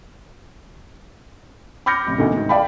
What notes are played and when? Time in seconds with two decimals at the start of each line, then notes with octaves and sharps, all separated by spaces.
1.86 B5 D6 F6 G6 A#6 C#7
2.06 A1 C3
2.18 D2 B2 D3 D#3
2.36 G#2
2.49 D5 F5 G5 A5 B5